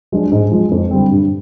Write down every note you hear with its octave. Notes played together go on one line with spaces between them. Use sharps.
F3 G#3 D4 F4
G#2
F3 G#3
F2
D3 G3 C4
G2